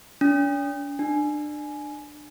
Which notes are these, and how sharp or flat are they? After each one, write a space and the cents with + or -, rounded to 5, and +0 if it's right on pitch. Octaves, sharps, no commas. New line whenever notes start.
D4 -45
D4 +25